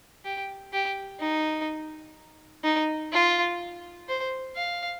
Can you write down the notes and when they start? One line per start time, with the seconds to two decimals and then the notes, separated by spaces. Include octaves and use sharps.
0.25 G4
0.73 G4
1.20 D#4
2.64 D#4
3.12 F4
4.08 C5
4.56 F5